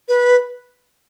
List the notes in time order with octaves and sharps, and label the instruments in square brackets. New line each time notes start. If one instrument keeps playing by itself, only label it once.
[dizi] B4